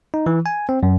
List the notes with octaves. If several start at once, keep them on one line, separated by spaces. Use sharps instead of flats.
D#4
E3
G#5
C4
F#2